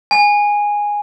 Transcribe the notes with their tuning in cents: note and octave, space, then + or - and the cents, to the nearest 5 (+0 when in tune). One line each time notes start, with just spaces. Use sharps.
G#5 -5